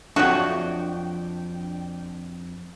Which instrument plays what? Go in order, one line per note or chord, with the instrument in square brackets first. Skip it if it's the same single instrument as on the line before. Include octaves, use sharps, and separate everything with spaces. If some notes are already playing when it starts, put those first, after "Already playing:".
[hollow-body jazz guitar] F2 C#5 [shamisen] F#3 A3 [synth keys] D4 G5 [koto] F#4